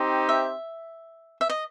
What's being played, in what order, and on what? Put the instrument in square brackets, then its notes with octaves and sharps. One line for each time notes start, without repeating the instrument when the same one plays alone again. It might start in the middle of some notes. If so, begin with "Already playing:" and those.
Already playing: [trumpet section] C4 D#4 G4 C5
[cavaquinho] E5
E5
D#5